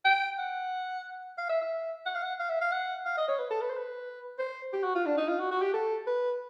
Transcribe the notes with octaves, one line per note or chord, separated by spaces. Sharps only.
G5
F#5
F5
E5
E5
F#5
F5
F#5
F5
E5
F5
F#5
F5
D#5
C#5
B4
A4
B4
C5
B4
C5
G4
F#4
F4
D4
D#4
F4
F#4
F#4
G4
A4
B4